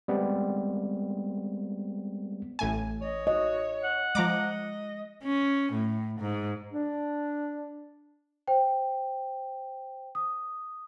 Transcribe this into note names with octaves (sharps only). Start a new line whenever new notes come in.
G3 G#3 B3 C4
A1 A2 G#5
C#5 D#5
F#4 D#5
F#5
F3 G#3 D#5 A#5 D6
C#4
A2
G#2
D4
C5 G5
D#6